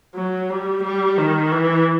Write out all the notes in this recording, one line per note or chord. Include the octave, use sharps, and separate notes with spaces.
F#3
G3
G3
D#3
E3